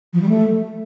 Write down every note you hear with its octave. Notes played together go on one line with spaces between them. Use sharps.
F3
G3
A3